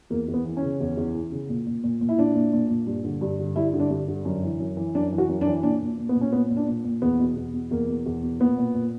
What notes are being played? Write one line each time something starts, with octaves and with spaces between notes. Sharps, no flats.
E2 A#3
E2
B3
E3
C#4
C#3
E2
E2
E3
C#3
A#2
A#2
A#2
A#2
E4
A#2 D4
A#2
A#2
A#2
G2
D3
G2
D3
G2 E4
D3
D4
G2
D3
F#2
E3
F#2
E3
F#2 D4
E3
F#4
F#2
D4
E3
A#2 D4
A#2
A#2
B3
A#2
C#4
A#2 B3
A#2
D4
A#2
A#2
E2 B3
B2
E2
B2
E2 A#3
B2
E2
B2
A#2 B3
A#2
A#2